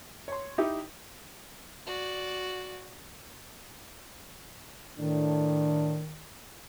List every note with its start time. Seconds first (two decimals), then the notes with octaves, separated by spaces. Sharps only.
0.28 C#5 C6
0.58 D#4 E4 G4
1.86 F#4 D5
4.99 A2 D#3 D4